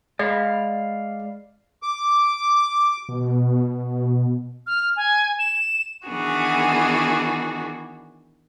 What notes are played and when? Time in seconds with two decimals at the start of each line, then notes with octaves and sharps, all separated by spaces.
0.19 G#3 D5 F5 B5
1.83 D6
3.09 B2
4.67 F6
4.97 G#5
5.39 E7
6.07 D#3 E3 B3 D4 F#4 G#4